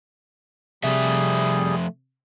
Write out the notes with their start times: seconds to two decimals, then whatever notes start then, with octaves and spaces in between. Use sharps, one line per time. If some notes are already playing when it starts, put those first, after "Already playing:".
0.84 C3 F3 G3 A3 G#4 E5